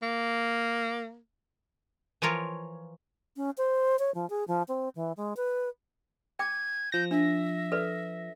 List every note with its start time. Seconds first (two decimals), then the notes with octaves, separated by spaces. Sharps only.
0.02 A#3
2.22 E3 F3 F4 A#4 C#5
3.36 C#4
3.58 C5
3.99 C#5
4.14 F3
4.30 G#4
4.48 F3
4.68 C4
4.95 E3
5.17 G#3
5.37 B4
6.39 G5 D6 G#6
6.92 F3 G6 A#6
7.11 D4 E5
7.72 A4 B4 D5